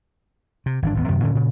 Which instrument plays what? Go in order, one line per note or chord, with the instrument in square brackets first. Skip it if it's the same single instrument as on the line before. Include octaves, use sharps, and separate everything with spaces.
[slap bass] C3
G#1 G2 E3 D4
G#1 D#2 B3
F#2 C3 D#3
D2 A2 D3 C#4
A#2 C#3